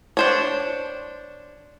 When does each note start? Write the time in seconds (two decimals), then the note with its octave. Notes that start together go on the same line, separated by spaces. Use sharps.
0.17 D4 C5 C#5